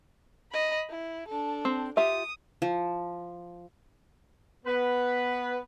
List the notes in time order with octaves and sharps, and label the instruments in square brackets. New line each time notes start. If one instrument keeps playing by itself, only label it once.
[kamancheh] D#5 B5
E4
D4 A4
[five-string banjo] C4
[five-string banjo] F4 G4 E5 [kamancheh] D#6
[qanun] F3
[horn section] B3 B4